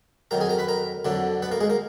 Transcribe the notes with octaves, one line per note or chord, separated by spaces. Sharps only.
F2 D#3 F#3 A#4 A#5
G#4 G#5
A#4 A#5
B4 B5
A#4 A#5
F2 D3 F#3 D4
B3 B4
A#3 A#4
G#3 G#4
A#3 A#4